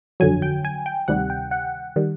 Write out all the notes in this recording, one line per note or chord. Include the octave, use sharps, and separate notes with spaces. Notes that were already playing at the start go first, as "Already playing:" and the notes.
G1 F2 D3 F#3 G#5
G5
G#5
G5
D2 C3 D#3 G3 F#5
G5
F#5
D#3 G3